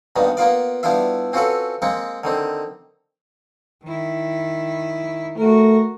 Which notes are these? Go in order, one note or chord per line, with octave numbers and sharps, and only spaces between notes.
G2 A#2 D#3 G3 B3
A#3 B3 F4 D5
G3 B3 D4 E4 F4 E5
C4 C#4 F4 F#4 A4 B4
G#3 A#3 C4 C#6
D3 D#3 C4
D#3 E4
A3 F#4 A#4